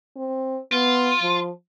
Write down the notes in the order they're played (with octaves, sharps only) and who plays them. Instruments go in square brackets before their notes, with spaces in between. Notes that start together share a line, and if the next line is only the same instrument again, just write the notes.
[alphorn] C4
[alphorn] B3 [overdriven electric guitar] F4
[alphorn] F3